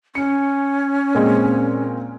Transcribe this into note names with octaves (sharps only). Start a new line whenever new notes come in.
C#4 C#7
A#2 G#3 C4